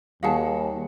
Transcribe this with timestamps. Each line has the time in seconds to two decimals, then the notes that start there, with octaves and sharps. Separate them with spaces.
0.23 D#2 G3 F#4 G#4 F5 F#5 G#5 A5